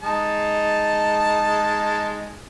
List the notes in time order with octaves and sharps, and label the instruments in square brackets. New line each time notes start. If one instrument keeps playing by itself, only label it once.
[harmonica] G#3 D#4 A5